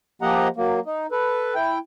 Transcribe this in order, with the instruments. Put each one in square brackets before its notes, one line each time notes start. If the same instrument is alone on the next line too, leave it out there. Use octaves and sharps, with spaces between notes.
[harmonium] F3 A#3 G4 D#5 F#5 A#5
F#3 A#3
D#4
A4 B4
E4 G5